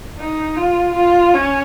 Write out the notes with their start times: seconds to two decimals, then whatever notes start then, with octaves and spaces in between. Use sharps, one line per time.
0.19 D#4
0.56 F4
0.95 F4
1.34 C#4